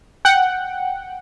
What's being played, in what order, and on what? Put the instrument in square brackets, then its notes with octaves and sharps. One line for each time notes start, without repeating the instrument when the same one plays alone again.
[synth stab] F#5 G5